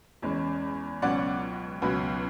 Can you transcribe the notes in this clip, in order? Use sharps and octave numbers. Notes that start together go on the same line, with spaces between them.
E2 C#3 G#3 C#4
C#2 B2 F#3 C#4 D5 F#5
C#2 B2 F#3 C#4 B4